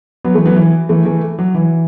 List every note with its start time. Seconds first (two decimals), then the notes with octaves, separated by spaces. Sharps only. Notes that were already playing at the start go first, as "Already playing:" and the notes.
0.24 F#3 B3
0.35 E3 A3
0.46 F#3 B3
0.56 E3
0.89 E3 A3
1.05 E3 A3
1.39 F#3
1.54 E3